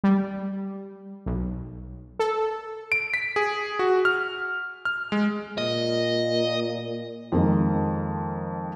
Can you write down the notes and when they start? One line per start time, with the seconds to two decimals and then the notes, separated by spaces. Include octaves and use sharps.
0.04 G3
1.26 B1
2.19 A4
2.92 D7
3.14 B6
3.36 G#4
3.79 F#4
4.05 F6
4.85 F6
5.12 G#3
5.58 A#2 D#5
7.32 F2 D#3 G#3 A#3